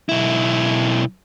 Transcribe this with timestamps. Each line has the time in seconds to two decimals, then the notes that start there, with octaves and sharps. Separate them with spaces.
0.09 B1 E4